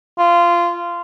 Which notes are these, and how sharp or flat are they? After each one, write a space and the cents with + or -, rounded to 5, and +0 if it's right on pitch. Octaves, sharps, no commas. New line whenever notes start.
F4 -15